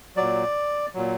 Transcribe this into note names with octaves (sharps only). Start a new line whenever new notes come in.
A#2 F#3 D5
A#2 F#3